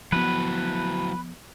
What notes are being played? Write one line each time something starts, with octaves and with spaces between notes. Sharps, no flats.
F3 F#3 B3 E4 F#4 B4